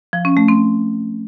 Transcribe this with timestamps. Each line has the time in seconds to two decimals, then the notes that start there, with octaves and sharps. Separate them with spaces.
0.13 F3
0.25 C#4
0.37 A3
0.48 C4